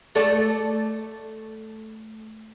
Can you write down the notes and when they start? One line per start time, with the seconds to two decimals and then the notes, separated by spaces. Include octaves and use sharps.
0.15 A3 A4 D5